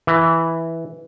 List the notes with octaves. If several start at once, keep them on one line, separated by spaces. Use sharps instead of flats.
E3